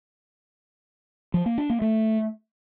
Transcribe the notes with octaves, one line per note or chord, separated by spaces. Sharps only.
F3
A#3
D4
A#3
A3